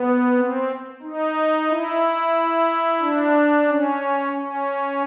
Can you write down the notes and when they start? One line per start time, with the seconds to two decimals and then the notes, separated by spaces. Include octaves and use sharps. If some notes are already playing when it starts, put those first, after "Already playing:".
Already playing: B3
0.36 C4
1.03 D#4
1.69 E4
3.00 D4
3.67 C#4
4.33 C#4